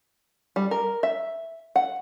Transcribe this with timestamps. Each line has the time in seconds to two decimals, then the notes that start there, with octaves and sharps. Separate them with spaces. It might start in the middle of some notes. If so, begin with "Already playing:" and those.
0.56 G3
0.71 A#4
1.03 E5
1.76 F#5